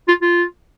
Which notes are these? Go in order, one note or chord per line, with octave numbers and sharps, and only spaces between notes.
F4
F4